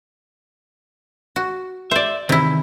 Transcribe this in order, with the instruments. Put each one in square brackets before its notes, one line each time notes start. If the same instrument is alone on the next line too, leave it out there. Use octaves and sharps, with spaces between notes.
[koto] F#4
[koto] C5 D5 [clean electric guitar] E5
[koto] C3 E4 [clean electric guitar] D#3 E3